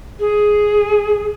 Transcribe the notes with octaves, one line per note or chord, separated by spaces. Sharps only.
G#4